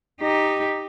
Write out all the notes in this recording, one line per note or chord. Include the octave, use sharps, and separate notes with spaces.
D#4 G4